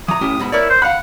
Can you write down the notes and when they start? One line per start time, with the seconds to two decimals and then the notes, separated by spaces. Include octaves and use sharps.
0.08 E3 A#5 D#6
0.21 A2 C#4 G4
0.39 G#2 B2 B5
0.52 E4 A#4 C#5 D5
0.70 C5
0.82 F5 F#5 B5